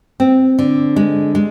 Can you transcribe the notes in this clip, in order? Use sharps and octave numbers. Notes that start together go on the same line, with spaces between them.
C4
D3
G#3
G#3